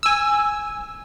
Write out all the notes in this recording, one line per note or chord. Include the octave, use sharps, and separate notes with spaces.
G#5 E6